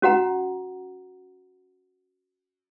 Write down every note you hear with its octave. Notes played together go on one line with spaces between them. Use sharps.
C#4 F#4 F#5 A#5